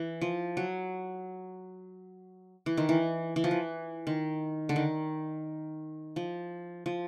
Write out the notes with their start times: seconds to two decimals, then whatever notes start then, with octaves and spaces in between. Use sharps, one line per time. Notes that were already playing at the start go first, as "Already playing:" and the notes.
Already playing: E3
0.21 F3
0.57 F#3
2.66 E3
2.77 D#3
2.89 E3
3.36 E3
3.44 F3
3.51 E3
4.07 D#3
4.69 D3
4.76 D#3
6.16 F3
6.86 F3